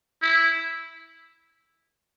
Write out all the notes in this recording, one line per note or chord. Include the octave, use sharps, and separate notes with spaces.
E4